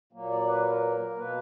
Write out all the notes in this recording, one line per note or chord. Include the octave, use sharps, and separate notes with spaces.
A#2 F#3 A#3
D5
B4
A#4
B2 A#3 B4